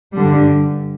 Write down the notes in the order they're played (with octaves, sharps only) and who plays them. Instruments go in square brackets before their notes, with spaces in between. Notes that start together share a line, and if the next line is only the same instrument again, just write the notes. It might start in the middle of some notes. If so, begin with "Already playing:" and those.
[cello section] G2 D3 G3